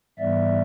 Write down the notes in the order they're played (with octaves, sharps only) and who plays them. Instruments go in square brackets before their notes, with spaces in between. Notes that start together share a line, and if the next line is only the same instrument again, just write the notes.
[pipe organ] G#2 E3 G3 B3 D5 E5